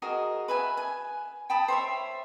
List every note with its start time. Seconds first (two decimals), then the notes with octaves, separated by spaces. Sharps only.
0.02 F#4 G#4 A#4 D#5
0.48 B4 E5 G#5
0.77 G#5
1.50 G5 A5 B5 D#6
1.68 C5 C#5 E5